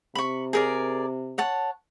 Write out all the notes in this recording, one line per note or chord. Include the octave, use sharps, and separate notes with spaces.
C3 B5 C#6
G#4 A#4 D5
C#5 F#5 A5